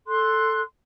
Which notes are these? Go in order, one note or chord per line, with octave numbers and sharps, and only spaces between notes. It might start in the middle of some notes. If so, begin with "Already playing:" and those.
A4 C6 F#6